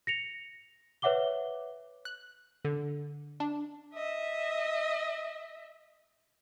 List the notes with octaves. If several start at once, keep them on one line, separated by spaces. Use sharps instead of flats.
A#6 C#7 F7
B4 C#5 E5 F#5 D6 G7
F#6
D3
D4
D#5 E5